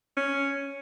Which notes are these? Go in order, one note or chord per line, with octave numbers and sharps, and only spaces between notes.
C#4